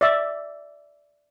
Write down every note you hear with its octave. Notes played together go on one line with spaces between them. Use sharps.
D5 E5